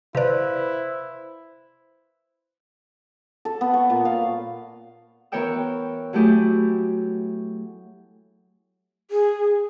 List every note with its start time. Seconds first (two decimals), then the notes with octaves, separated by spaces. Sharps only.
0.15 C3 E4 B4 C5 D5 F5 F#6
3.45 A4
3.61 B3
3.74 C#6
3.90 A#2
4.05 F5
5.32 E3 B3 A#4 C#5 G5 E6
6.13 F#3 A3 E4 G4 G#4
9.11 G#4